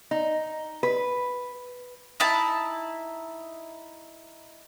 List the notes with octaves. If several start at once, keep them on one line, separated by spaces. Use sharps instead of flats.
D#4
B4
D#4 E4 A5